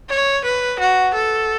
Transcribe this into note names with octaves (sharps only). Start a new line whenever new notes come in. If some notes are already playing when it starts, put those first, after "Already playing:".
C#5
B4
F#4
A4